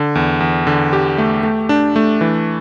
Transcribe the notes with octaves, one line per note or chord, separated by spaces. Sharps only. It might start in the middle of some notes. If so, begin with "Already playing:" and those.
Already playing: D3
E2
E2
D3
G4
A3
A3
D4
A3
E3